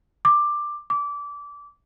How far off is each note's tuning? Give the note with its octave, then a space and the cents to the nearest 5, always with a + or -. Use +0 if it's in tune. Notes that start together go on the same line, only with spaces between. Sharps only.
D6 +10
D6 -25